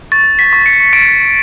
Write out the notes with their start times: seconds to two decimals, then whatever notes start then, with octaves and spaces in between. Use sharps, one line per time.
0.12 C#6 A6
0.39 B6
0.53 C#6
0.66 C#7
0.93 C#6 D7